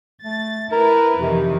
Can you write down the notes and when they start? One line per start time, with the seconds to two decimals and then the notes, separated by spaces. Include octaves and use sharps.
0.24 A3 A6
0.72 E4 A#4 B4
1.20 F2 C3 D#3 E3